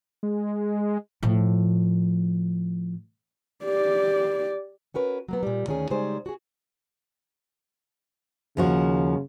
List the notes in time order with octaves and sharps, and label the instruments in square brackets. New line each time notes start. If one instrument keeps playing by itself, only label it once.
[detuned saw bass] G#3
[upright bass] A2 F3
[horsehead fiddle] G4 D5
[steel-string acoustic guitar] C#4 F#4 A#4 B4
F#3 A#3 B3
A#2 G3
D2 D#3 C#4 D#4 G#4
C#3 G3 G#3 D#4 G#4 C5
F#4 G#4
[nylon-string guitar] D#2 F3 F#4 [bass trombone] C#3